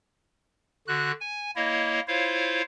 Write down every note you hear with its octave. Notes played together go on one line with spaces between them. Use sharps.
D3 F#4 F#6
G#5
A#3 E4 C#5 D#5
E4 F4 C5 C#5 F5